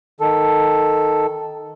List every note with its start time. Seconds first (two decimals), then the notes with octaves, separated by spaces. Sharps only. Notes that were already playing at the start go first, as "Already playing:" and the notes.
0.20 D#3 A4